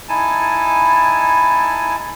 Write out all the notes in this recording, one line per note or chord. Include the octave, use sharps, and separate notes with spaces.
D#4 E4 G#5 A5